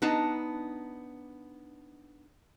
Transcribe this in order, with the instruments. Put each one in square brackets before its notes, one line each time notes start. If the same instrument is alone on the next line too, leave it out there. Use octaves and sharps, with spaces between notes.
[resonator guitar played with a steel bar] B3 D4 D#4 A5 A#5